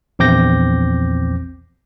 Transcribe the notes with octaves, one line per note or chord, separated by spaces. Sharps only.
A#1 E2 C4 D6 G6 A#6